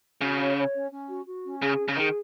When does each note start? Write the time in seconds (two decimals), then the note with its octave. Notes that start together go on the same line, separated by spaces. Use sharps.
0.21 C#3 F#4
0.39 C#5
0.57 C#5
0.74 C#4
0.91 C#4
1.10 F#4
1.27 F#4
1.44 C#4
1.62 C#3 G#4
1.79 C#4
1.88 C#3
1.97 D#3 G#4